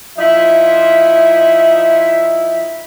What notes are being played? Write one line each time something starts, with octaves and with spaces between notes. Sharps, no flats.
F3 D#4 E4 E5